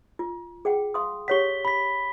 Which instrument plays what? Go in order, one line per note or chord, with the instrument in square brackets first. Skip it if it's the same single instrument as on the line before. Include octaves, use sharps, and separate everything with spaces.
[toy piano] F4
G#4 F#5 G5
F5 C6 D#6
[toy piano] G4 C#5 F#5 [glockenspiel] B6 G7
[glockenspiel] B5 B6